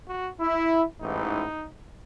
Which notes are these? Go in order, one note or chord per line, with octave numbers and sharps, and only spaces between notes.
F#4
E4
A1 G#2 E3 D#4